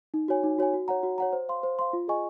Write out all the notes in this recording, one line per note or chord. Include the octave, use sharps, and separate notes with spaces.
D#4
F#4 C#5 G#5
D#4
F#4 C#5 G#5
F#4
C#5 F#5 A#5
F#4
C#5 F#5 A#5
C5
F5 C6
C5
F5 C6
F4
G#4 D#5 G#5 C#6